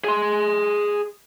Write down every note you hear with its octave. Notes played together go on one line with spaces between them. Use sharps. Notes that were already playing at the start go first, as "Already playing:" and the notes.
G#4 C6